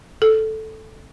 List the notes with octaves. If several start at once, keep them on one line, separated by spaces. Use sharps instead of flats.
A4